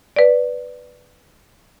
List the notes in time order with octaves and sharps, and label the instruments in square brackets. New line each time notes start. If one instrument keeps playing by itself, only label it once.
[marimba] B4 D5